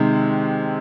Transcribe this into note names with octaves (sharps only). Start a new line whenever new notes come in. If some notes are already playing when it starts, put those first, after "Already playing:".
Already playing: C3 D#3 G#3 C4